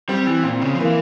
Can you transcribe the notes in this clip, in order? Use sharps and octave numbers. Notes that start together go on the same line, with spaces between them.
G3 C4
E3
A#2 C4
C#3
F3
E3 A#3